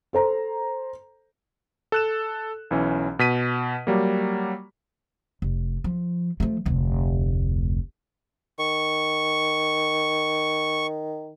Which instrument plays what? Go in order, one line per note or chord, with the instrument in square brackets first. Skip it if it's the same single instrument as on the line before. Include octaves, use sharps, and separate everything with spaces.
[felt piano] A4 C5 A#5
[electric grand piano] A4 F#6 E7
B1 E3 C#4
B2 B6 D#7
F#3 G3 A#3
[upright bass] F1
F3
F3 A3
F1 D2
[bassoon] D#3 [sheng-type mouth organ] C#6